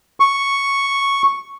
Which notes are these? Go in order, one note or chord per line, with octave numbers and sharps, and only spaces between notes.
C#6